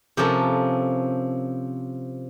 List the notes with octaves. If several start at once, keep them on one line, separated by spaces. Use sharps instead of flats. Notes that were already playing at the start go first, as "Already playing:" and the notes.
C3 F3 C#4 A4 A#4